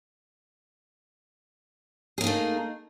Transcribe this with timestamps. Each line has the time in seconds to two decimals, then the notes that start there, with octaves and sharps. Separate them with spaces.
2.18 G#4
2.21 A#3
2.24 D#4
2.27 A3